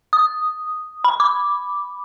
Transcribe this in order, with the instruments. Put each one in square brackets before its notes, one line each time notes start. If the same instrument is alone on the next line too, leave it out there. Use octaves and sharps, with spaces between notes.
[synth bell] D#6
B5
D6